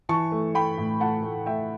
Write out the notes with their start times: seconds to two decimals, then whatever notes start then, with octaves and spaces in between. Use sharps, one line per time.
0.09 E3 A5 C#6
0.32 A3
0.54 A3 G5 B5
0.78 A2
1.00 A3 F#5 A5
1.23 A3
1.46 A3 E5 G5